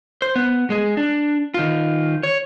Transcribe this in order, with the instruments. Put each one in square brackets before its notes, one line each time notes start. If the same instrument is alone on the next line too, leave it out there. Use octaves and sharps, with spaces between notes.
[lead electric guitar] C5
B3
G#3 G#4
D4
D#3 F4
C#5